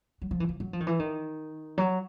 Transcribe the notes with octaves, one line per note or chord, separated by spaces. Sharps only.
F#3
F3
E3
F3
F#3
F3
D#3
E3
D#3
F#3